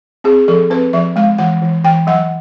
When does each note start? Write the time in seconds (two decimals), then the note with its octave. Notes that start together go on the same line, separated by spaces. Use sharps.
0.24 C4 G#4
0.48 F3 A4
0.70 C4 B4
0.93 F3 E5
1.16 G#3 F5
1.38 E3 F#5
1.62 E3
1.84 E3 G5
2.07 F#3 F#5